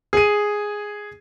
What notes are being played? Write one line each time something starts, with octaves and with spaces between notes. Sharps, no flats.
G#4 D#7